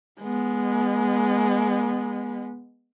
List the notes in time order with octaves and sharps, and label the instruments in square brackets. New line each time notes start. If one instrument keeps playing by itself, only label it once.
[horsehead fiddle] G#3 B3